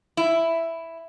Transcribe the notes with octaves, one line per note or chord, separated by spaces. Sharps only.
E4